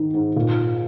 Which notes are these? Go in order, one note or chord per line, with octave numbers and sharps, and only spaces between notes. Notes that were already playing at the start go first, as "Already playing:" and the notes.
Already playing: G#2 D#3
G#2
A#2